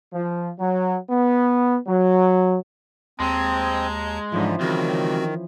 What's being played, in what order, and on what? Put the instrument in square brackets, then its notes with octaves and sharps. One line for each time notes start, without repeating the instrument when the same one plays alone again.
[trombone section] F3
F#3
B3
F#3
[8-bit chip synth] D#2 A5 A#5 [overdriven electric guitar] G#3 [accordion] C4 [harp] C6
[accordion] G#2 D3 [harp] E3 F3 C#4
[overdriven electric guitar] C#2 [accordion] D#3 [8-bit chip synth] C4 F#4